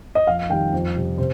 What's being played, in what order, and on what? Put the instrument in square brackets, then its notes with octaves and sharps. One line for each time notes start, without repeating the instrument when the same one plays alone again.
[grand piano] D#5
F2 F5
D#3 G3 G5
F2
C3 G3
C3 C5